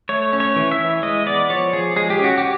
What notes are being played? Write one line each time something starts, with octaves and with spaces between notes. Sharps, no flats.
A3 C#5
C#4
C#5
E3
E5
E3
G#3 D#5
B3 D5
F3 C#5
F3 G#4
G#3 G#4
G4
C#4 F#4
G4